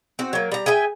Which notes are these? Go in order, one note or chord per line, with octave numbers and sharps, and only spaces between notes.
C4 F#4
F#3 A#3
G3 A#5
G#4 E5 G5 G#5